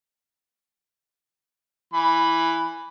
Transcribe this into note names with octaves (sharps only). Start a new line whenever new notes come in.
E3 B5